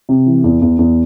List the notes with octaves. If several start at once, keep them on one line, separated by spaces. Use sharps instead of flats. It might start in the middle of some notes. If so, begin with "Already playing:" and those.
C3
E3
E2
E2
E2